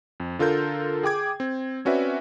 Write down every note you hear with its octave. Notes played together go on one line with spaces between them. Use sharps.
F2
D3 F4 A4 A#4 G6
G#4 G5 D6 G#6
C4
C4 C#4 F#4 B4 D5 E5